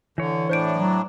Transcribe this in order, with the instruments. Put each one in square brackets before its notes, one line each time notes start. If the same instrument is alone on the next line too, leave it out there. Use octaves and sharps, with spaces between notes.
[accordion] D3 [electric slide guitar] E3 C#5
[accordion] A2 D4 [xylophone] C5 G6 D7
[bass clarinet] F#3